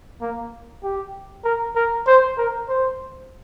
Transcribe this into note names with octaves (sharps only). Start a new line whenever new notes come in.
A#3
G4
A#4
A#4
C5
A#4
C5